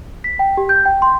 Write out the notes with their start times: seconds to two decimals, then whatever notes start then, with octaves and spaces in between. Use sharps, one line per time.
0.24 B6
0.39 G5
0.57 G4
0.69 G6
0.85 G5
1.02 C6